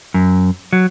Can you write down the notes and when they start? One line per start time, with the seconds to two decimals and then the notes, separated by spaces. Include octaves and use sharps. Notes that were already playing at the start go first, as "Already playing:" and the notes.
0.14 F#2
0.73 F#3